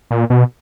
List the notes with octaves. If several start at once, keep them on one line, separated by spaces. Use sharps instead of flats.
A#2
B2